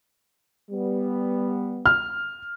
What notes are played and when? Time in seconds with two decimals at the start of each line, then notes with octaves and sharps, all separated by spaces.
0.71 G3 B3
1.86 F6